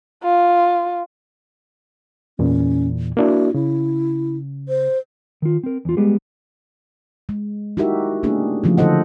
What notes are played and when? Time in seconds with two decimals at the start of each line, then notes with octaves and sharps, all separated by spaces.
0.23 F4
2.39 E2 A#2 E3 C#4
3.17 A#3 D4 E4 F#4
3.54 C#3 E4
4.69 C5
5.42 D#3 F4
5.63 C4 A#4
5.85 E2 F4
5.97 G3 G#3 B3 G4 G#4
7.29 G#3
7.77 D#4 E4 F#4 G4 A#4 E5
8.23 A3 A#3 C#4 D4 G4 G#4
8.64 C#3 E3 F3 A3 C#4 F4
8.78 D3 D#4 A4 C5 D#5 F#5